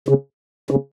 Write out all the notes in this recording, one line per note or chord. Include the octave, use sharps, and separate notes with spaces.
C#3
C#3